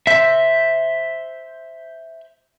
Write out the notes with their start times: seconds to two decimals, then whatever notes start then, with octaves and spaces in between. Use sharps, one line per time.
0.07 C5 E5